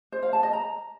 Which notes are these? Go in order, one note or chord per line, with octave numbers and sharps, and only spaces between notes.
C5
F5
A5
D#5
A#5